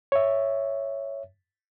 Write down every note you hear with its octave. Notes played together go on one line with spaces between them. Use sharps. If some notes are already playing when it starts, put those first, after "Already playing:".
C#5 E5